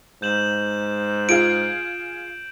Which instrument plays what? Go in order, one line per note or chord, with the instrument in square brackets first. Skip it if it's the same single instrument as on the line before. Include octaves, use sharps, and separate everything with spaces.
[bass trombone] G#2 [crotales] G6 E7 F#7
[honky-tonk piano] F4 G#4 F5 [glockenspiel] D7